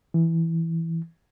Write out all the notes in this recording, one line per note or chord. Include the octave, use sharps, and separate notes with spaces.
E3